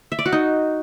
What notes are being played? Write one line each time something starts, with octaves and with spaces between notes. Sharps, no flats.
E5
D5
F#4
D#4